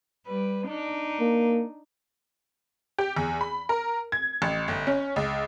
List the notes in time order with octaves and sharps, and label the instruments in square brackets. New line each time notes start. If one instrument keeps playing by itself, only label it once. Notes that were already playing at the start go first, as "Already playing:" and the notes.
[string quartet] G3 B4
D4 D#4
[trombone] A#3
[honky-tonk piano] G4
E2
B5
A#4
G#6
A1
G1
C#4
C#2